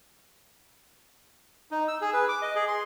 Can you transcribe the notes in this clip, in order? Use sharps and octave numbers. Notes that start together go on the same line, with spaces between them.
D#4
E6
G#4
B4
D6
D#5
G#4
C6